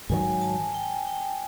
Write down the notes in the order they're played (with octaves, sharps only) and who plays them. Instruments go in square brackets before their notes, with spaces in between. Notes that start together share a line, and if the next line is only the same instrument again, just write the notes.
[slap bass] G#2 D#3 F#3 [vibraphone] G#5
[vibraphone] A5
G5
G5